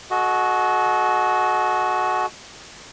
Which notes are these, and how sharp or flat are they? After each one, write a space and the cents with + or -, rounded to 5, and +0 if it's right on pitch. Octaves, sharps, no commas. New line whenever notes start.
F#4 +0 A4 -40 D#5 +0